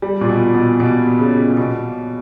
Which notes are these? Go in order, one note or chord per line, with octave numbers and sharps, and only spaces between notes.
G3
A#2
B2
B2
B2
C#3
B2